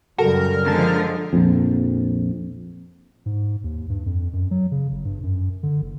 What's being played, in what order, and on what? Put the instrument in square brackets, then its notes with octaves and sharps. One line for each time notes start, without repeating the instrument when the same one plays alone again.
[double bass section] F#2 C#3 G3 [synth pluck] F#4 A4 [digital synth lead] A#4
[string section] D3 F3 [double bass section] G#3 [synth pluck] A5
[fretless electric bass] A#1 F2
[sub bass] G#2
D#2
G2
F2
F#2
F#3
C#3
G1
G2
F#2
D3
F#1